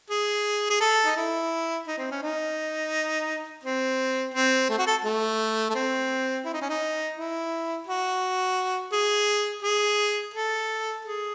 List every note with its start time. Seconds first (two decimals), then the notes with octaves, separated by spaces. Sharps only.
0.10 G#4
0.70 G#4
0.81 A4
1.05 D#4
1.17 E4
1.87 D#4
1.98 C4
2.11 C#4
2.22 D#4
3.63 C4
4.34 C4
4.69 A3
4.79 F#4
4.87 A4
5.05 A3
5.70 A3
5.75 C4
6.45 E4
6.53 D#4
6.61 C#4
6.69 D#4
7.16 E4
7.87 F#4
8.92 G#4
9.63 G#4
10.34 A4
11.05 G#4